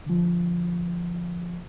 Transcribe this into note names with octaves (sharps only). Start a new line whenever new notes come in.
D3 F3